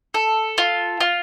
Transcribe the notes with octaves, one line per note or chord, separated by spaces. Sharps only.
A4
F4
F4